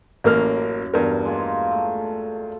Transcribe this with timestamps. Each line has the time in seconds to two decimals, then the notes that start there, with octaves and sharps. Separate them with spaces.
0.24 A1 F#2 A#3 F6
0.94 E2 G2 A#4
1.25 G#3 A#3 F4
1.71 A3